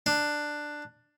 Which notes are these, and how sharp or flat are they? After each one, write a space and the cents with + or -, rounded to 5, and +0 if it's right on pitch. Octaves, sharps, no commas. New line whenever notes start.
D4 +10